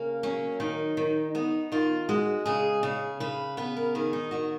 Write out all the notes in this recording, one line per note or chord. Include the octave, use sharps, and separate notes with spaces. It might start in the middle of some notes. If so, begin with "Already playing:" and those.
Already playing: C#3 A#3
F#3 C#4
D#3 D#4
D#3
B3 D#4
D#3 F4
G#3 F#4
C#3 G#4
C#3 G#4
C#3 B4
B3 B4
A#4
D#3 G#4
D#4
D#3 F#4